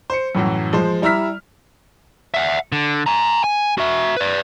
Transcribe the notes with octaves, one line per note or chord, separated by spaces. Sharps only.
C5 C#7
F#2 A2 E3 F#3
F3 G#3 C5
G3 E4 A#5 E6 F6 B6
E5 F#5
D3
G#5 A#5
G#5
F#4 E5
B4 D5